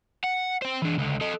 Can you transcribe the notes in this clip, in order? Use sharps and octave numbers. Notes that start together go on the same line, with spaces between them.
F#5
C5 G5
E3 D4
C#2 D3
A4 D#5